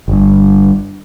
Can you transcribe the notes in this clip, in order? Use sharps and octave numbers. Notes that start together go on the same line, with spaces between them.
G1 G2